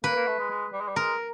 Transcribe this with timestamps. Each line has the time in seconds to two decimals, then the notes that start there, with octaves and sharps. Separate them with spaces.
0.04 A#3 B4
0.16 A#3
0.27 A3
0.39 G#3
0.50 G#3
0.73 G3
0.81 G#3
0.88 G3
0.96 G#3 A#4